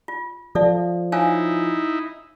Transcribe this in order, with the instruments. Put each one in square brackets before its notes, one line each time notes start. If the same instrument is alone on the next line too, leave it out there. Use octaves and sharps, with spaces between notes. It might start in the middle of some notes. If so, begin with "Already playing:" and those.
[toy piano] F4
[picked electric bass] F3 [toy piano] A4 D5 E5
[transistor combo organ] D#4 E4 [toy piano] C#5 F5 G#5